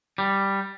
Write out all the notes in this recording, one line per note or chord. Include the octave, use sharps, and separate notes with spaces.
G3